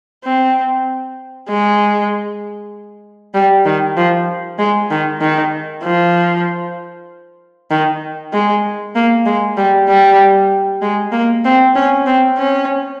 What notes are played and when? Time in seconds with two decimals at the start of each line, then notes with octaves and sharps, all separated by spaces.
0.24 C4
1.48 G#3
3.35 G3
3.66 D#3
3.97 F3
4.59 G#3
4.91 D#3
5.21 D#3
5.83 F3
7.71 D#3
8.33 G#3
8.95 A#3
9.26 G#3
9.57 G3
9.89 G3
10.82 G#3
11.12 A#3
11.45 C4
11.75 C#4
12.06 C4
12.37 C#4